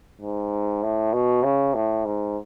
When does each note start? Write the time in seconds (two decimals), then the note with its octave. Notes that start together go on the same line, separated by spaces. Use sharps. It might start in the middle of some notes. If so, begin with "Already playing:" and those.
0.21 G#2
0.83 A2
1.13 B2
1.44 C#3
1.75 A2
2.05 G#2